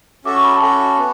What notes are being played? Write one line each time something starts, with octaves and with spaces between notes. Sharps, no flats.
C#4 F#4 A4 E5 D6
C#6
B5
A5
C#4 F#4 A4 E5 G#5
B3